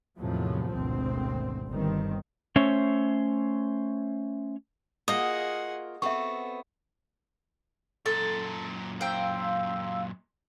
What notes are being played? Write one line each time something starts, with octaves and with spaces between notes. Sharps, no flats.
E2 A2 C3 D#3 F3 F#3
G#1 D2 B2 C4
G1 G2 D#3 C4
A3 C#4 C5 C#5 E5
A#3 F4 F#4 G#4 D#5 F#5
B3 C4 F#4 A4 E5 C#6
F#2 A#2 A4
C5 F5 G5 E6